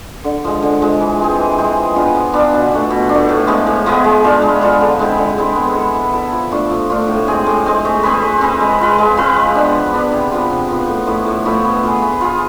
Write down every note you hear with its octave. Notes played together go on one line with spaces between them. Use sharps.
D3
F3 G#3
D3
F3 G#3
E3
G#3 C4 G#4
E3
G#3 C4 G#4
F3
B3 D4 F4
F3
B3 D4 F4
B2
A3 D4
B2
A3 D4
A2
F3 G#3 B3
A2
F3 G#3 B3
G#3
D4 F4 A4
G#3
D4 F4 A4
D3
G#3 C4 E4
D3
G#3 C4 E4
B3
E4 A4
B3
E4 A4
F3
A3 D4 F4
F3
A3 D4 F4
A2
G#3 C4 G#4
A2
G#3 C4 G#4
A3
C4 G#4 B4
A3
C4 G#4 B4
G#3
C4 F4 B4
G#3
C4 F4 B4
F3
B3 D4
F3
B3 D4
C3
F3 B3 F4
C3
F3 B3 F4
A2
F3 A3 E4
A2
F3 A3 E4
B3
F4 G#4
B3
F4 G#4